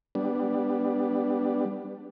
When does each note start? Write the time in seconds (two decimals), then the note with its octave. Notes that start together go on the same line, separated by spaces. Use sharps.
0.15 G3 B3 D4